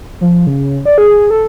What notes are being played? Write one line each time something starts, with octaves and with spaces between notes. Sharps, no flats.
F3
C#3
D5
G#4
A4